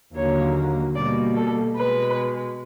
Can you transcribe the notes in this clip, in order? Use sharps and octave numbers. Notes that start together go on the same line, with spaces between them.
D#2 D3 F#3 A#3 C#5
B2 G3 A#3 D5
A4
B2 G#3 B4